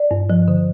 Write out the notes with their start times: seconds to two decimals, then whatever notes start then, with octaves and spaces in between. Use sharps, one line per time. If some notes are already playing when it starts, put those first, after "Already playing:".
Already playing: D5
0.11 G2
0.30 F3
0.48 D3